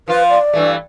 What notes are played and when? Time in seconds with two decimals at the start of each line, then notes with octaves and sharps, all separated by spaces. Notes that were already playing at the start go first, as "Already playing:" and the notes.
0.08 F3 F4 B4
0.30 D5
0.53 G2 E3 A3